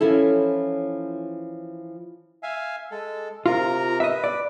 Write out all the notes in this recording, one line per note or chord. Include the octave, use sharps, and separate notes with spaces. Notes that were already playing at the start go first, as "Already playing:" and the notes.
E3 F3 C#4 E4 A4
E5 F5 G#5
G#3 A4
C3 F4 A#4 A#5
B4 D#5 E5
D5